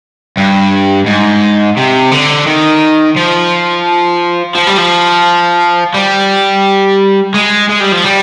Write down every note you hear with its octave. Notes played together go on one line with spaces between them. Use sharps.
G2
G#2
C3
D3
D#3
F3
F3
G3
F3
G3
G#3
G#3
G3
F3
G3